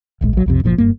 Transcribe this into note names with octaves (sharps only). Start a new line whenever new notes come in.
D1 A#1 G3 G#3
A#1 F#3
B1 F2 C3
F#1 A#2 D3 F3
F#1 G2 A#3